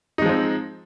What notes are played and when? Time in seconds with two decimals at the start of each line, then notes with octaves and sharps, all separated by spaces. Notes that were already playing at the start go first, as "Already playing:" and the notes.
0.18 D#4
0.22 G#3
0.26 F3
0.29 C4